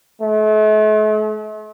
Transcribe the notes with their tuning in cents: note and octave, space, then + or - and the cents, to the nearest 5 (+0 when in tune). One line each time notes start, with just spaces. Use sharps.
A3 -45